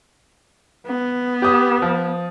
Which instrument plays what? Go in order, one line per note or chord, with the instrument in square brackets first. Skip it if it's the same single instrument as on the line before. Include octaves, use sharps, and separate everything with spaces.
[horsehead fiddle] B3
[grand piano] G4 D#6
F3